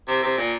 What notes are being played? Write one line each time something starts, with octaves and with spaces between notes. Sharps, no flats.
C3
C3
A#2